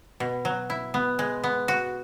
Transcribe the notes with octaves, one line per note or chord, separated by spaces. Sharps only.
B2
F#3
E4
B3
G#3
B3
F#4